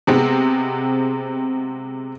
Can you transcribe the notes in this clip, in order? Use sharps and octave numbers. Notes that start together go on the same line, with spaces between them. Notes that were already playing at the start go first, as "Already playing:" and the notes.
C3 G#3 B3 C4